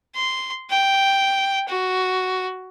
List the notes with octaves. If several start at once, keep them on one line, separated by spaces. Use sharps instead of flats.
C6
G5
F#4